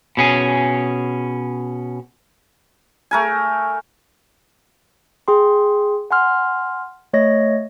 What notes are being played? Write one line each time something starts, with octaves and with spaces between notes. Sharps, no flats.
B2 C#4 G#4
A3 A#4 G#5
G#4 G5 C6
F#5 G#5 C6 F6
A3 C#5 D#5 A#6